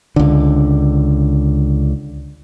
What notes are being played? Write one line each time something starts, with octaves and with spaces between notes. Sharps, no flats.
C#2 D3